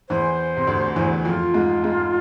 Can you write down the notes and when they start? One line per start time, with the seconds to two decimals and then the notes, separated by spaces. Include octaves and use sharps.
0.09 E2 E3 C5
0.57 C3
0.67 D2 D3
0.96 E2 E3
1.25 F2 F3 F4
1.54 G#2 G#3
1.84 G#2 G#3